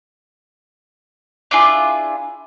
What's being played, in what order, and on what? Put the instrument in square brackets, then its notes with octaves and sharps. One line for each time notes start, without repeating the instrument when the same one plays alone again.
[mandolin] D4 E4 F4 G#4